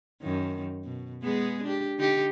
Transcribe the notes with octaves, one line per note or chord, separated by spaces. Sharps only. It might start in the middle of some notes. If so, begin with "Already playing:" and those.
F#2 D#3
B2
G#3 B3 G#4
D4 G4
D3 D#4 G4